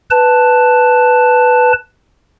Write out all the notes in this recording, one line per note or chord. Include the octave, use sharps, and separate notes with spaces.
B4 A5